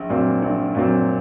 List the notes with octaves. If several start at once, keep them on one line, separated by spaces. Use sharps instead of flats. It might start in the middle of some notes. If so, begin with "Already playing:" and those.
Already playing: A#1
A#2 F#3 C4
A#1
A#2 F#3 C4